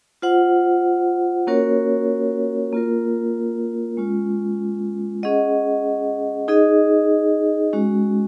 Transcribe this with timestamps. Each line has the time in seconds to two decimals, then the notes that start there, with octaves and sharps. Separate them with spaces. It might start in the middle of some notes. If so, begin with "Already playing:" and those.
0.22 F4 C5 F#5
1.47 A#3 C#4 F#4 A#4 C#5
2.73 A#3 F4 A#4
3.97 G#3 C#4 F4
5.23 C#4 G#4 D#5 F#5
6.48 D#4 G#4 D#5
7.73 G#3 C#4 F#4